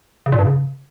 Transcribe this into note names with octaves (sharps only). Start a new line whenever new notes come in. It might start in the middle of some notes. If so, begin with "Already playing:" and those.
C#3
A#2
G2
C#3